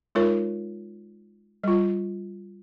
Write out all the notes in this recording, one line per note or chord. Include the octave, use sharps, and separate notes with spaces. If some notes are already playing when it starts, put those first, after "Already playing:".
G#3 D#4 F4 A#4 C#5
G3 F4